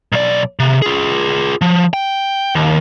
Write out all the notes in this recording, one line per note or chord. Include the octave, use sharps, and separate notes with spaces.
B1 D5
C3
F4 G#4
F3
G5
D#2